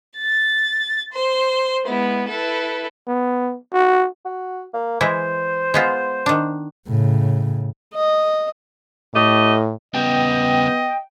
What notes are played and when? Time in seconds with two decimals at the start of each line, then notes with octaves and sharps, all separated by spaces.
0.17 A6
1.11 C5
1.86 G#3 B3 E4
2.29 E4 A4 B4
3.08 B3
3.73 F#4
4.25 F#4
4.73 A#3
5.01 E3 G#3 E4 C5
5.74 G#3 B3 F4
6.26 D#3 D4
6.88 A2 C#3
7.94 D#5
9.14 A2 A3 G4 D#5
9.94 C#3 G3 B3 D#5 G5